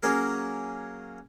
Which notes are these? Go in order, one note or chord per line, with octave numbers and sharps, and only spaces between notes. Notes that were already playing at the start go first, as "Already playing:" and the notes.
F#3 A#3 C#4 G#4 A#4